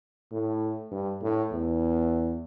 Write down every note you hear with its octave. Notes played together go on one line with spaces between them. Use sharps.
A2
G2
A2
E2